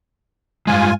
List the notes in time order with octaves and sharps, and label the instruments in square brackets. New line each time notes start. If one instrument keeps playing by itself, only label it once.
[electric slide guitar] G2 C#3 G#3 [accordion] F4 G#5